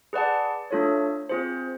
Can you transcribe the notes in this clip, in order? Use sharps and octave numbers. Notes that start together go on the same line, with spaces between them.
G#4 B4 D5 F#5 A5
A3 D4 F4 A4 C#5
C4 F4 G#4 C5